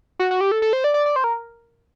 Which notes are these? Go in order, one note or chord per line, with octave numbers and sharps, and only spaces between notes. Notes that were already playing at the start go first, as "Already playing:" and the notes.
F#4
F#4
G4
A4
A4
C5
D5
D5
D5
C5
A#4